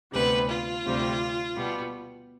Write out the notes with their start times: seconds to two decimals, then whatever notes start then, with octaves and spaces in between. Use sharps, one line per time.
0.13 D2 C3 G3 B3 B4
0.49 F4
0.84 D2 C3 G3 C4
1.56 B2 G3 B3